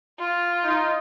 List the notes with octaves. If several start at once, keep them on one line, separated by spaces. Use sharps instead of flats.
F4
D#4